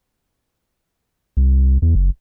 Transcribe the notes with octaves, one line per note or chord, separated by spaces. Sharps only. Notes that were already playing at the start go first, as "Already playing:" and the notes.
C2
E2
F#1